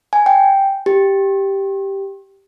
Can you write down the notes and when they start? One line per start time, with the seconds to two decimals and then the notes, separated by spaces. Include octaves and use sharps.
0.13 G#5
0.26 G5
0.86 G4